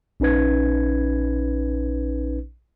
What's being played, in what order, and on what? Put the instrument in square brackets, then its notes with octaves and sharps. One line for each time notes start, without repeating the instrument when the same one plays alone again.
[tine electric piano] A#1 C#4 D#4 B4 G#6